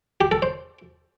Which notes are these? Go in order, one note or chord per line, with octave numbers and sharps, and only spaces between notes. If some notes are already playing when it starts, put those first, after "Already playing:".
G4
A4
C5